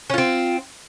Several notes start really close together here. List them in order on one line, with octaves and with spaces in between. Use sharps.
C#4 F4 C4